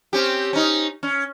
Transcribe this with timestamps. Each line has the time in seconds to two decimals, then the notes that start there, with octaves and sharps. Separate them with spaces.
0.13 C4 C#4 G4
0.53 C#4 D#4
1.03 C#4